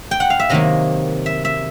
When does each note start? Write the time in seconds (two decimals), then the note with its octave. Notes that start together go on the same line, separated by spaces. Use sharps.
0.11 G5
0.20 F#5
0.30 F5
0.40 E5
0.49 C3 D#3 F#3 A#3 D#5
1.26 E5
1.45 E5